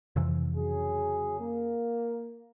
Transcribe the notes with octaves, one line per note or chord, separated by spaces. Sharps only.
F2 C3 E3
C#3 F#3 G#4
A#3